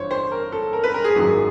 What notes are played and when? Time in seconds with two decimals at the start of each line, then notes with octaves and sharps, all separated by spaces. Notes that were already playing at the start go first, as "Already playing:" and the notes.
Already playing: G1 G2 E3 C5 C#5
0.11 C5
0.32 A#4
0.52 A4
0.73 A#4
0.84 B4
0.94 A#4
1.04 G#4
1.15 G#1 F#2 D#3 F#3